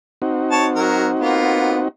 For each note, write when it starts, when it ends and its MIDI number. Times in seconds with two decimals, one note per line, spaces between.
0.22 1.88 60
0.22 1.88 63
0.22 1.88 66
0.51 0.67 73
0.51 0.67 81
0.76 1.08 54
0.76 1.08 70
1.20 1.82 58
1.20 1.82 59
1.20 1.82 65